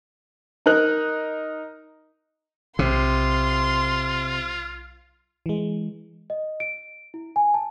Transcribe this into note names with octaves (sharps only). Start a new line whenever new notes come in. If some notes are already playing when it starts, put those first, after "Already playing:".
D#4 A#4 F#6
B1 C3 F4 C6
E3 G#3
D#5
D7
E4
G#5
A5